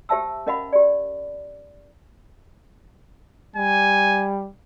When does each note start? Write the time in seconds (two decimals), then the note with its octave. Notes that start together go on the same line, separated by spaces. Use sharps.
0.09 G4 C5 E5 A5 E6
0.46 C#4 A#4 D#5 F5 F#5 B5
0.73 G4 D5
3.56 G3 G#5